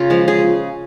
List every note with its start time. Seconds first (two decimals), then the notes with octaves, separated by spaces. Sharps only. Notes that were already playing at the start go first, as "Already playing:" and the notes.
Already playing: C#3 F4
0.10 F3 G#3
0.28 C#3 G#4